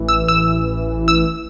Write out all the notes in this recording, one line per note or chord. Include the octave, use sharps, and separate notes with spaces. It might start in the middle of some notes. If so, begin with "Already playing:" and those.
Already playing: A1 E3
E6
E6
E6